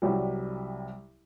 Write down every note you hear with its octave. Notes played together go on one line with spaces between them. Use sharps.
C2 F#3 G3